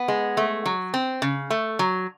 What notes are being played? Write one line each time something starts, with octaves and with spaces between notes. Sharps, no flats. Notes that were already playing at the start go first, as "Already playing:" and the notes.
Already playing: B3
G#3
A3
F#3
C4
C#3
A3
F#3